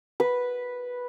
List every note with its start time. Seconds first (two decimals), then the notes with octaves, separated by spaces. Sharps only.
0.20 B4